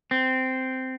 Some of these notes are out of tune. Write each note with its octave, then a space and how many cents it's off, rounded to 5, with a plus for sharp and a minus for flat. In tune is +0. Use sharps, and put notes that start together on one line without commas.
C4 -10